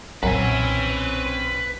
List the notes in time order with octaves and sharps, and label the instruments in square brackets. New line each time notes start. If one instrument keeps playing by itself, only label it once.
[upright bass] B1 A#2 [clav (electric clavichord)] F#2 [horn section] C4 C#4 [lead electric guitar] B4 G#5